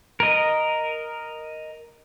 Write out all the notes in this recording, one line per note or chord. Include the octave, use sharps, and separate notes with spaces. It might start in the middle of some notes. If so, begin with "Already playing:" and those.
A#4 D#5